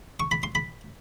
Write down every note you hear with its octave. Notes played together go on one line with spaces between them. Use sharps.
C#6
B5
C6
B5